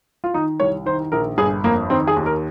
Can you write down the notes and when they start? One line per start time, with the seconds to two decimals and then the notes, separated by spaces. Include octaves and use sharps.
0.24 F4
0.34 D#3 D#4
0.60 C2 C#5
0.86 D#3 C5
1.12 A#1 A#4
1.38 G1 G#4
1.64 F2 A#3
1.90 D#3 C4
2.07 G#4
2.17 D#2
2.26 A#4